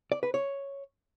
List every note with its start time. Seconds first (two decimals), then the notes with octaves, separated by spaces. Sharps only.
0.12 D5
0.23 B4
0.34 C#5